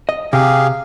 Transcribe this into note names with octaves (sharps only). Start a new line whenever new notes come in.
D#5
C3 G4 G#4 F5